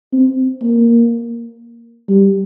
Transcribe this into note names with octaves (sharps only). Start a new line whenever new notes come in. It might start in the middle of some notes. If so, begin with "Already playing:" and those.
C4
A#3
G3